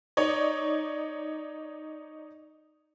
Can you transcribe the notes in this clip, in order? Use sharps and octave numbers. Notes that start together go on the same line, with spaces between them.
D#4 C#5 D5